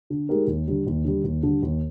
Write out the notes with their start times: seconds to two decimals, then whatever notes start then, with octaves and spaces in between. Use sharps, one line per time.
0.10 D3
0.29 G#3 D#4 G4 A#4
0.47 D#2
0.67 D3 G3
0.87 D#2
1.04 D3 G3
1.24 D#2
1.43 D3 G3
1.63 D#2